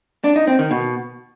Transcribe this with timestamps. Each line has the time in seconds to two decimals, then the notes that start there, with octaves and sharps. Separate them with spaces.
0.24 D4
0.36 D#4
0.47 C4
0.59 D#3
0.71 B2